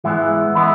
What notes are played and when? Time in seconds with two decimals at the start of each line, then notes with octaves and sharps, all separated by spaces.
0.04 G#2 E3 G#3 B3 E4
0.55 E3 G#3 B3 E4